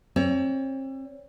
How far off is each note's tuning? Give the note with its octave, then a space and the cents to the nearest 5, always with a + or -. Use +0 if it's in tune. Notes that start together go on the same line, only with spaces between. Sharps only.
C4 +40 C#5 +40